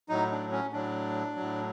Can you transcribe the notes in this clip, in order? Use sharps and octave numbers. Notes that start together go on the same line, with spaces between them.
A2 F#3 D#4
D4
C#4
A2 F#3 D4
A2 F#3